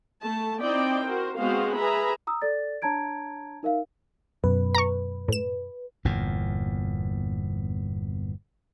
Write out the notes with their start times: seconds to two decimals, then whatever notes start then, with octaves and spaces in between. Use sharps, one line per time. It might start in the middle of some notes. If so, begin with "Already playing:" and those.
0.22 A3 A5
0.60 C4 D#4 E4 D5 D#5 G5
1.03 F#4 A#4 C5
1.37 G#3 B3 C4 F#4 C5 F5
1.75 G#4 B4 E5 A#5 B5
2.27 A#5 D#6 E6
2.42 A4 D5 A6
2.82 D4 C#5 A5 A#5 G#6 D7
3.63 D#4 A#4 E5 F5
4.44 F#2 B2 B4
4.75 A#5 C#6
5.28 A2 E7
6.05 G1 E2 A#2